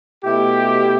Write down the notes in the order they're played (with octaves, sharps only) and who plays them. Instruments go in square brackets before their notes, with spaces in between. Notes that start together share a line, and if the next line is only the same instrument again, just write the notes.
[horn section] B2 A3 E4 G4